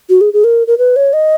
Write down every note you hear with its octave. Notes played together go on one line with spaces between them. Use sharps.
F#4
G#4
G#4
A#4
A#4
B4
C#5
D#5